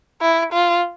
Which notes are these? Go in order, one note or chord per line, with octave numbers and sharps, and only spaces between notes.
E4
F4